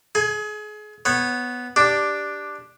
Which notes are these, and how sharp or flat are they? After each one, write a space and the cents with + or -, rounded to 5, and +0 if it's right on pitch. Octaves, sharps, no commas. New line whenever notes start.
G#4 +30 G#5 +0
B3 +0 C#5 -20
D4 +0 G4 +5